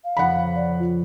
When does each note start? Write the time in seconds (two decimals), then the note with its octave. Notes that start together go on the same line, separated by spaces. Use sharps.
0.04 F5
0.17 F2 C#3 F3 F#5 B5
0.55 D5
0.80 F4